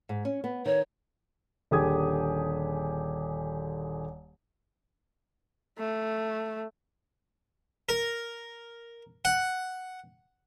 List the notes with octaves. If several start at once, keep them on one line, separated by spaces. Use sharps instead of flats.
G#2
C#4
B3
D#3 C#5
D#1 D3 G4 G#4 D#6 G#6
A3
A#4
F#5